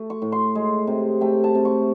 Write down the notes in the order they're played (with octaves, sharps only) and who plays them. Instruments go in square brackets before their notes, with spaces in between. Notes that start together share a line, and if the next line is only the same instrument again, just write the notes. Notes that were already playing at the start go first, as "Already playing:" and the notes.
Already playing: [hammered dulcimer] A3
C#6
A2
C6
G#3
C3
A3 G5
A5
C3
C#6